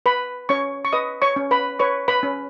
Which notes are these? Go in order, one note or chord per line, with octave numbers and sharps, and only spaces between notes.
B4 B5
C#4 C#5 C#6
C#6
B4 D#5 D#6
C#5 C#6
C#4
B4 B5
B4 C#5 C#6
B4 B5
C#4